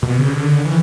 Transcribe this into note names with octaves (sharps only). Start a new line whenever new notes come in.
B2
C#3
D3
E3